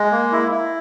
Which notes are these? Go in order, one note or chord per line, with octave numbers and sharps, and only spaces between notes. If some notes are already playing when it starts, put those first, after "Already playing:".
Already playing: G#3
A#3
E4
E4